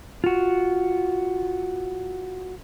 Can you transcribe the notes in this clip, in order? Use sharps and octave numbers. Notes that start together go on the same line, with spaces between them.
F4 F#4